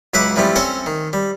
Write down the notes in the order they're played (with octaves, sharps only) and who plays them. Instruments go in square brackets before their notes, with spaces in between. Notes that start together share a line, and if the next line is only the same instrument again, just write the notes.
[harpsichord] C#2 F#3 B4 E5 F#5 D6
E3 F3 G3 A3 C4
C4 C#4 A4 C5 C#5
D#3
G3